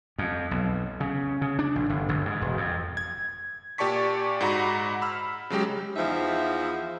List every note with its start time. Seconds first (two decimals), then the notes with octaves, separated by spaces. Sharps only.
0.18 F2
0.51 B1
1.00 C#3
1.41 C#3
1.59 D4
1.76 A#1
1.89 G1
2.09 G1
2.25 G#2
2.42 E1
2.57 F2
2.97 G#6
3.78 A#2 G4 D5 A5 C#6 B6
4.41 G#2 F#4 A#5 B5
5.02 B5 E6 F6
5.50 C#3 F#3 G#3 G4
5.96 E2 F3 D#4 E5